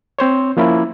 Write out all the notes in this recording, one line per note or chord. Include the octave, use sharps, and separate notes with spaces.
C4 C5 C#5
F3 A#3 C#4 E4